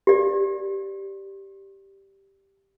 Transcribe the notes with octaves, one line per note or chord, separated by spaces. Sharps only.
G4 D5